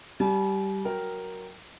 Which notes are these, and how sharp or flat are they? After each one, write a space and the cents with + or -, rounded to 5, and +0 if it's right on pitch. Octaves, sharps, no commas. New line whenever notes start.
G3 -10 G#5 +45
F#3 +0 A#4 +0 G5 +0